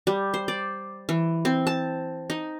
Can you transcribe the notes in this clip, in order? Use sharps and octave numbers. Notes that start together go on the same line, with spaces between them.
G3
C5
D5
E3
C4
A5
D#4